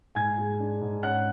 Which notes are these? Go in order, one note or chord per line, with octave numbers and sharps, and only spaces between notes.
G#2 G#5 G#6
G#3
D4
G#2
C#4 F#5 F#6